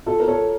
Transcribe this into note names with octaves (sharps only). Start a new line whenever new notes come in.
F4 A4
A#4
A4 C#5